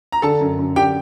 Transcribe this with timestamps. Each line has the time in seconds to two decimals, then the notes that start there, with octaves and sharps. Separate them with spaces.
0.12 A#5
0.22 D3 A4 A5
0.41 F#2
0.59 F#2
0.76 D3 G4 G5